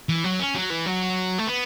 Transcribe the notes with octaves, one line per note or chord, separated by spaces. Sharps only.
E3
F#3
C#4
F#3
E3
F#3
A3
B3